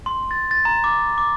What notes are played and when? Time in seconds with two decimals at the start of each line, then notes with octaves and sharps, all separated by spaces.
0.06 C6
0.31 A6
0.51 A6
0.65 A#5
0.84 D6
1.18 D6